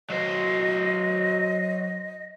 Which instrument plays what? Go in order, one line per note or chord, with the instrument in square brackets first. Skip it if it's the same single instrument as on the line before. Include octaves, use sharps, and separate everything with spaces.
[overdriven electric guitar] F#3 C5 [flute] D#5